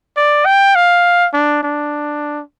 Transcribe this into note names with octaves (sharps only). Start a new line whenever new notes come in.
D5
G5
F5
D4
D4